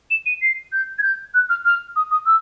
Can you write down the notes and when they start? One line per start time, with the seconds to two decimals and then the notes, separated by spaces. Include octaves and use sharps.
0.11 E7
0.26 D#7
0.42 C7
0.72 G6
0.98 G#6
1.03 G6
1.34 F#6
1.49 F6
1.65 F6
1.96 D#6
2.11 D#6
2.26 E6